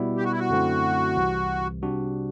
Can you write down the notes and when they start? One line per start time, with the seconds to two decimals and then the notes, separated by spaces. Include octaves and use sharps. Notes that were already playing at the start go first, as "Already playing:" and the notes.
Already playing: B2 G3 B3 E4
0.17 G4
0.25 F#4
0.32 E4
0.39 F#4
0.50 F#2 D3 A3 C4 E4
1.16 C2 C3 E3
1.82 C3 G3 D4 F#4